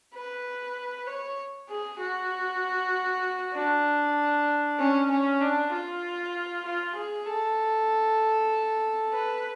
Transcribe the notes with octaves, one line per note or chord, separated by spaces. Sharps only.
B4
C#5
G#4
F#4
D4
C#4
C#4
D4
F4
F4
G#4
A4
B4